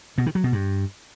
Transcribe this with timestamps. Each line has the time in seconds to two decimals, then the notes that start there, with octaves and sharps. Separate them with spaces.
0.18 B2
0.26 D#3
0.35 F#3
0.44 B2
0.52 G2